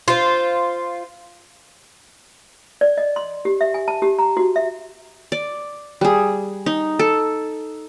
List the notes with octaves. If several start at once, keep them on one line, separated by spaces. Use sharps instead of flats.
F4 C5
D5
D#5
C6
G4
E5
G#5
A5
G4
A#5
F#4
E5
D5
G3 G#4
D#4
A4